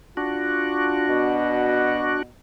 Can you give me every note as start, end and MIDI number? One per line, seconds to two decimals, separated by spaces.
0.17 2.22 62
0.17 1.07 65
0.17 2.22 66
1.08 2.30 47